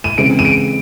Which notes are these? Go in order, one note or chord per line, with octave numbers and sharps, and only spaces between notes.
D#7
C#3 E3 G#3 C4 D7
D#7
D7